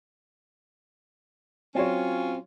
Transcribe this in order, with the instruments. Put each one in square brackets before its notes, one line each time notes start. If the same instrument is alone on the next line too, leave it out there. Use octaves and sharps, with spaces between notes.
[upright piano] F#3 C#5 [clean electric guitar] C4 [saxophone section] C#4 F4